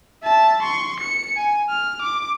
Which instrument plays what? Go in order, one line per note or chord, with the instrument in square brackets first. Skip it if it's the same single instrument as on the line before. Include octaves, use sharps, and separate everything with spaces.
[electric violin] E5 A5
C6 C#6
C#7
G#5
F6
D6